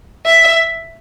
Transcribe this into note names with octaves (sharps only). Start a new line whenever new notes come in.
E5